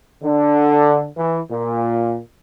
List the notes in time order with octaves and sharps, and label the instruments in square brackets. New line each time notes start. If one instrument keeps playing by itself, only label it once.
[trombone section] D3
E3
A#2